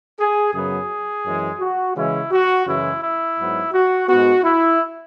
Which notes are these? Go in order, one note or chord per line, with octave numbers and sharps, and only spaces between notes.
G#4
F#2 C#3 F#3 B3 G#4
F#2 E3 G#3
F#4
C#3 E3 G#3 C#4 E4
F#4
F#2 C#3 E3 G#3 E4
E4
G#2 F#3 B3
F#4
G#2 G#3 B3 F#4
E4